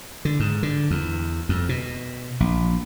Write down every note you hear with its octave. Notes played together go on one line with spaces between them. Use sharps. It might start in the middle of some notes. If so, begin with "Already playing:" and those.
D3
G#2
D3
E2
F2
B2
A#1